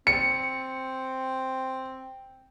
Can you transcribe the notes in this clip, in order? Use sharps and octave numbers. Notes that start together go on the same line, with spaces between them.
C4 C#7